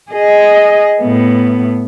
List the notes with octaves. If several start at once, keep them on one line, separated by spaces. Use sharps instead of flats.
G#4 D#5
A2 B3